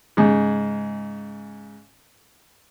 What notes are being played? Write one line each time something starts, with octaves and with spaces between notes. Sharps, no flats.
G#2 C#3